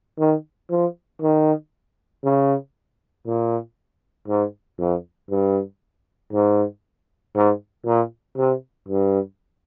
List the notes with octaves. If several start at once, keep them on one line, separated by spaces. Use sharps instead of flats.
D#3
F3
D#3
C#3
A#2
G#2
F2
G2
G#2
G#2
A#2
C3
G2